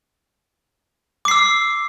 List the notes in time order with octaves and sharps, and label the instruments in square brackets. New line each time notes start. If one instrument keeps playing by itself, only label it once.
[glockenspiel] D6
C7
E6